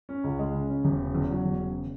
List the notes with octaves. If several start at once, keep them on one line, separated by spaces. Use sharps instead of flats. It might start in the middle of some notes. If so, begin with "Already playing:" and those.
C#4
C#2
G#3
C#3
C#4
E1
C#3
E2
F#3
E1
C#3